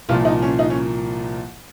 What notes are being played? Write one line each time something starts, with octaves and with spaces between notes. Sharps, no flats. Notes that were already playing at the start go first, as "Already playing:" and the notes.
C2 A#2 F3 F4
D#4
C#4
D#4
C#4